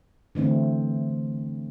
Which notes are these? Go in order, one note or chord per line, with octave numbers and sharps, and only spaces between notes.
D3 E3 A3 C4